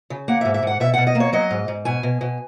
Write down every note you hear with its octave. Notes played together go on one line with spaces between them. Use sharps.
C#3
A#3 F#5
G#2 E5
E5
G#2 F#5
B2 E5
F#5
B2
D#5
A#3
C#5
F#3 D#5
G#2
G#2
B2 G#5
B2
B2